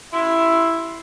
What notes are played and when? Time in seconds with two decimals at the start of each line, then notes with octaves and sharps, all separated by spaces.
0.13 E4 E5 C6